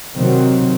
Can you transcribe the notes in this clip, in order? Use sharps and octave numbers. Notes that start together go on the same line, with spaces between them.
C3 D#3 F#3 C4